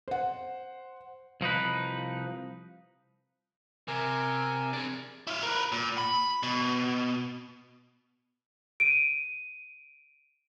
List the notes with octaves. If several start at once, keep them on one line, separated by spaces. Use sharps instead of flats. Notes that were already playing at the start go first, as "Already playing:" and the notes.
C5 F#5
C2 F3 D#4 B4
C3 A#4 G#5
D4 G#4
E4 F5
A#4 B4
A#2
B5
B2
D7 D#7